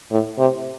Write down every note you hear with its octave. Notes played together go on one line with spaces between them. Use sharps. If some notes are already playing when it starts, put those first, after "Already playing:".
A2
C3